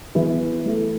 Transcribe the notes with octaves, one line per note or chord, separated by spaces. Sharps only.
E3 B3 E4 G#4 B4
A3 E4 A4